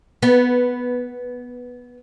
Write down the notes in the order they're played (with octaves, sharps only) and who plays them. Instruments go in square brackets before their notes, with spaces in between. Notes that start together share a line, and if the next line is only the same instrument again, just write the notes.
[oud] B3